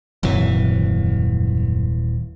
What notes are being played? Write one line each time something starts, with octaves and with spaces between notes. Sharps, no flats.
D#1 F#2 C3 E3